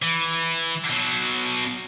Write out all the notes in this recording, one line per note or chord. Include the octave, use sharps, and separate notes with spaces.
E3
B2 F#3